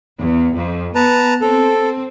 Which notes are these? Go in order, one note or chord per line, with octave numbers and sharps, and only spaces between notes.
E2
F2
B3 B4 A5 A#5
C4 A4